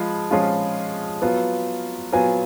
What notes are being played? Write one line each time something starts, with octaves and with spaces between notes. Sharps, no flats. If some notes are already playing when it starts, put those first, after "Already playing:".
Already playing: F3 G#3 F4 B5
F3 G#3 C#4 F4
F#3 B3 F4
F#3 B3 F4 G#5